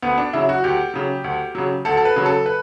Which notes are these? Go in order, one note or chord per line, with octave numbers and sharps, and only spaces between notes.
D2 B3
D4
C#3 F#3 E4
F#4
D2 G4
C#3 F#3
D2
C#3 F#3
D2 A4
A4
B4
C#3 F#3
A4
B4